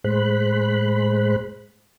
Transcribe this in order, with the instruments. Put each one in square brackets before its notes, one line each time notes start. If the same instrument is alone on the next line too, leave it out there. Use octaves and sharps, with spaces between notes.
[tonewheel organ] A2 G#3 C5 B5 F#6